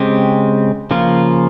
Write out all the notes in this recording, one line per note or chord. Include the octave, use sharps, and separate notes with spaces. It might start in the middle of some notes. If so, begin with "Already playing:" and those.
Already playing: C#3 G#3 C4 G4
C#3 F3 A#3 F4